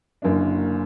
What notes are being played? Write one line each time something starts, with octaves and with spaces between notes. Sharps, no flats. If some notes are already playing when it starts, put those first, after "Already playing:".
F#1 F#2 D3 A#3 D4